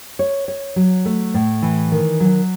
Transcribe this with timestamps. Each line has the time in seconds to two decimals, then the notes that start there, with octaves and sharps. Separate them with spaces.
0.19 C#5
0.48 C#5
0.76 F#3
1.05 A3
1.34 A2
1.62 E3
1.92 D#3
2.20 F#3